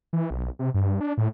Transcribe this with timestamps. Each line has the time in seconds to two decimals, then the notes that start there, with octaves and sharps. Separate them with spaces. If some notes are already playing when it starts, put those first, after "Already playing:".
0.13 E3
0.31 B1
0.59 C3
0.74 G2
1.01 D4
1.18 A2